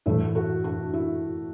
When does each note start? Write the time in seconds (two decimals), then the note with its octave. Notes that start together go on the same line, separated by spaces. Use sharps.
0.06 A2 E3 A3 E4
0.35 F#4 A4
0.64 D4 F#4
0.94 E4